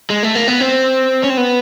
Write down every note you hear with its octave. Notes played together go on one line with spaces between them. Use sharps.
G#3
A3
A#3
B3
C4
C#4
C4
B3